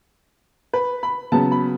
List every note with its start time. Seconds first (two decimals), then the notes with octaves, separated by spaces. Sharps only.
0.73 B4
1.03 B5
1.32 C#3 F#3 B3 A5
1.52 B5